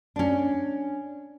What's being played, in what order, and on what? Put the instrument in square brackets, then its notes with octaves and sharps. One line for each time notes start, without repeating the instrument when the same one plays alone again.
[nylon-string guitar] C#4 D4